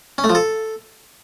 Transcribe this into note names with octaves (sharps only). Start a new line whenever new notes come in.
C#4
A3
F3
A4